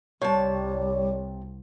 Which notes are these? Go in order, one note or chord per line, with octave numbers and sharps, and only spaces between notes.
C2 C3 G3 C#5 A5